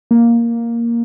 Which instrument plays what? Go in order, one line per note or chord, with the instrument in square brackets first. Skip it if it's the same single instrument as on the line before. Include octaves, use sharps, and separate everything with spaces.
[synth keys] A#3